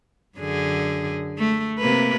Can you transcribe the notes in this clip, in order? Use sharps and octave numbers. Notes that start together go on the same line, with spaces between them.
F#2 D3 G#4
A3
C3 A#3 B4